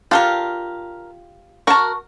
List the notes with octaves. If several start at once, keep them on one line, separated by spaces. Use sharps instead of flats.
D4 F4 G4 A4 A#4
F#4 A#4 A5 C#6